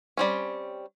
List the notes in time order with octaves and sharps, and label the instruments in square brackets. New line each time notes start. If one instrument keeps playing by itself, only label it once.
[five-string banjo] G3 C4 C#4